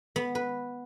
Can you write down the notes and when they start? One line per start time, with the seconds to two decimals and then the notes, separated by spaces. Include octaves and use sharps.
0.16 B3
0.35 B4